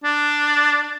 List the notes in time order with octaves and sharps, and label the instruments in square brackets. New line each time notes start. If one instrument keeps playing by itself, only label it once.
[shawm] D4